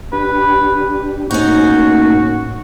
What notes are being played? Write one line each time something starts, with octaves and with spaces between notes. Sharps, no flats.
D4 G4 B4
A2 A#3 C#4 D#4 F#4